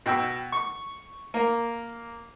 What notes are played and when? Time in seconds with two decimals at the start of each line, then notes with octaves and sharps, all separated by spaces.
0.06 B2 G5 E6
0.52 C#6
1.34 A#3